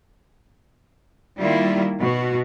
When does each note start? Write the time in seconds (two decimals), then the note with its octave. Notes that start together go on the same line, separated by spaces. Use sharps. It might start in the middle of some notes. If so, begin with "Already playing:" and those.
1.40 D#3 G3 A#3 E4 F4
2.01 B2 F#4